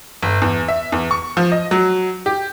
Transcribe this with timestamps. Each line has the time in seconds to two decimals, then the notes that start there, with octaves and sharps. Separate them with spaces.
0.23 G1
0.42 E2
0.68 E5
0.92 E2
1.11 C#6
1.37 F3
1.52 D#5
1.71 F#3
2.26 G4